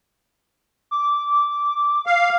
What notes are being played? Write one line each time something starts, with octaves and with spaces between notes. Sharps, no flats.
D6
F5